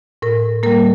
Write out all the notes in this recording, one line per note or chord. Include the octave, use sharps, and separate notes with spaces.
A2 A#4
G3 A#3 A#4